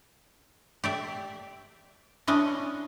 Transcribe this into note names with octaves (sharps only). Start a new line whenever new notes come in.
G4 D5 E5
C#4 D4 E4 D#5